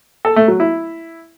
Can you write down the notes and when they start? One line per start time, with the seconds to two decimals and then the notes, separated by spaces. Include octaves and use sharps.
0.25 A4
0.36 A3
0.48 F#3
0.60 E4